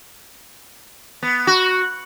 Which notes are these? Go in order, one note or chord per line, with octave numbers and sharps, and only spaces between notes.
B3
F#4